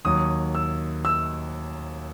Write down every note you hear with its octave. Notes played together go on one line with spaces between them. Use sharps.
D#2 D#3 F#3 D#6
E6
E6